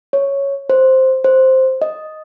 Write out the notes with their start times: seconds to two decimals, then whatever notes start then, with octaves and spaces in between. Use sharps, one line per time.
0.13 C#5
0.70 C5
1.24 C5
1.82 D#5